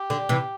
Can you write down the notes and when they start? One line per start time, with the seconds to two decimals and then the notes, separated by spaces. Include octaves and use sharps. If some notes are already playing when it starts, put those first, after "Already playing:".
Already playing: G4
0.10 D3
0.29 C3 E3